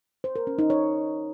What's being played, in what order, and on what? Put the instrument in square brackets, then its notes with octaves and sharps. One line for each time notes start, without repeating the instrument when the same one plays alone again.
[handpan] C5
A#4
C#4
D#4
C#5